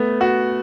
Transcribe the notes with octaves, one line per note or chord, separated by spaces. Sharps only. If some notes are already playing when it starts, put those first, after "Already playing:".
Already playing: A3 B3
F#4